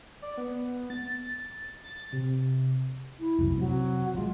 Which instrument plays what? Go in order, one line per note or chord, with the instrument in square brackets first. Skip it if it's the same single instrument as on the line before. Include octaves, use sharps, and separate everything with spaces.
[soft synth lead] D5
B3
A6
A6
C3
[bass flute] E4
[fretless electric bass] F1 C2 F#2
[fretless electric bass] C3 [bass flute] F#3
[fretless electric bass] F#3 G#3 [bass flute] F4